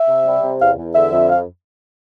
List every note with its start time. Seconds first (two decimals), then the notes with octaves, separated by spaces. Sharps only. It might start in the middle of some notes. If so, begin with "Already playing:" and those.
Already playing: E5
0.08 C3
0.25 G3
0.43 C3
0.60 E2 F5
0.77 E2
0.95 D3 E5
1.11 F2
1.29 F5